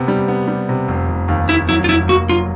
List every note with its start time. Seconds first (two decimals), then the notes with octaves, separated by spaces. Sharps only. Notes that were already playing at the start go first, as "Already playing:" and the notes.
Already playing: C3 B3
0.08 G3
0.28 B3
0.48 G3
0.69 C3
0.88 F1
1.08 F1
1.28 D#2
1.49 D#2 E4
1.69 F#3 E4
1.84 F4
1.89 F1 E4
2.09 A#3 F#4
2.29 F#3 F4